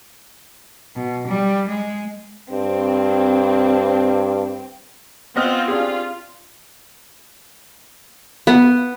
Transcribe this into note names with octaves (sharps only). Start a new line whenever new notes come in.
B2
G3
G#3
G2 C4
B3 C4 F4 D#5 F6
D4 F4 G4 G#4
B3